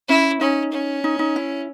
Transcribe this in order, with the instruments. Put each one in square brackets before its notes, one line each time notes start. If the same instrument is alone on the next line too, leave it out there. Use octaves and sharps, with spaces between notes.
[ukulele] C#4 [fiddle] E4
[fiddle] C#4 [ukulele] D#4
[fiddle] C#4
[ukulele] D#4
D#4
E4